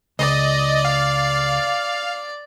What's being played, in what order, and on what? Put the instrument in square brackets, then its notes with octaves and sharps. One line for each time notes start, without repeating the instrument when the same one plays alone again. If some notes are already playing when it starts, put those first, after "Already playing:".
[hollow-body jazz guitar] C#2 [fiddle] D5 [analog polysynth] D#5
[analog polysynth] F5